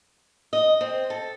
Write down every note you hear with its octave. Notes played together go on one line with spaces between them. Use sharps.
D#5
C4
A4